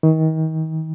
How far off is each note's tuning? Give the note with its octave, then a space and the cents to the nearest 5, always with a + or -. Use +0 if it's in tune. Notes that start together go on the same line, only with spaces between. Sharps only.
D#3 +35